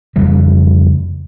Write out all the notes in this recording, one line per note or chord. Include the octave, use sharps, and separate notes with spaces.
F2 C#3 E3 G3